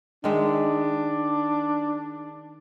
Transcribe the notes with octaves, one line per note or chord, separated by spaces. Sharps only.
D#3 G#3 D4 E5